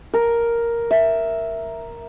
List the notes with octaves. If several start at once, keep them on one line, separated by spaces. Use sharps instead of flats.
A#4
E5